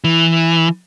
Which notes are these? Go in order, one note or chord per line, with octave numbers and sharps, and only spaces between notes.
E3